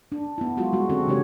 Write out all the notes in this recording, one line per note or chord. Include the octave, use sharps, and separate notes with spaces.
D4
B3 E4
F#3 G#3 F4 F#4
G3 G#3 F#4
D3 G#3 C4 C#4 F#4 A4
C#3 E3 G#3 D4 G4 C#5